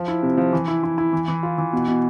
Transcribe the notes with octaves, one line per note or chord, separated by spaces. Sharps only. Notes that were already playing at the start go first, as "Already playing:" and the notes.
Already playing: F3
E4
C3
F3
E3
E4
E4
E4
E3
E3
F4
E3
B2
B2